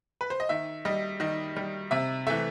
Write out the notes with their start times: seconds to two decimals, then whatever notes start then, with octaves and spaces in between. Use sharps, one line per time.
0.21 B4
0.30 C5
0.40 D#5
0.49 D#3 E5
0.85 G3 D#5
1.20 D#3 D#5
1.57 G3
1.91 C3 E5
2.27 E3 A3 E5